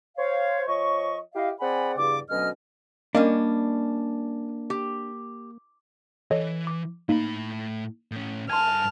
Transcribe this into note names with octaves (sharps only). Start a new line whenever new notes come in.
C5 C#5 F5
F3 C#5 D#5 C#6
E4 G4 D#5 F5
C4 G#4 D5 F#5 G#5 B5
E2 G2 C#3 D5 D6
D2 B2 F#3 C#4 D#5 F6
G3 A#3 C#4 D4 D#5
G4
E3 A4 C#5 D#5
D6
A2 A#3 D#4 B5
A2 C#4
G2 G#5 A5 C6 F6 G#6